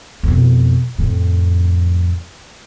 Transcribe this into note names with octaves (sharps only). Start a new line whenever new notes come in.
F2 B2
F2 A2